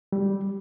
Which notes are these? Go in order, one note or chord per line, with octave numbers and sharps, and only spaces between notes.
G3